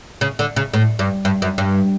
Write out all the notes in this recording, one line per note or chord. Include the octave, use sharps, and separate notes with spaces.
C#3
D3
C#3
A2
G2
G2
F#2
G2